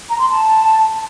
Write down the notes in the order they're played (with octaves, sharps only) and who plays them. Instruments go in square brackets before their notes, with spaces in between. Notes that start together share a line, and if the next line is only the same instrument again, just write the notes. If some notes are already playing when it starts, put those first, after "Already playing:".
[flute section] A#5
C6
A5